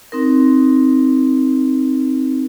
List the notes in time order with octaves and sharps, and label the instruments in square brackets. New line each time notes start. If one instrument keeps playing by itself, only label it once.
[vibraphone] C4 D#4 A#4